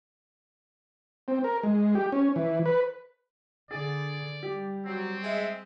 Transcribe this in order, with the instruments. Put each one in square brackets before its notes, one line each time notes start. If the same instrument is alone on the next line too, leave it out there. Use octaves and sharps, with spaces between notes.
[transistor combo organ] C4
A#4
G#3
G4
C#4
E3
B4
[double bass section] D3 [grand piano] G#4 [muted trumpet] D5
[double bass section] G3 [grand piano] G4
[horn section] F#3 [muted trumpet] C4
[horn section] G#3 E5